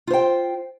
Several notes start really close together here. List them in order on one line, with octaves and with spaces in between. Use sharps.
F4 C5 G5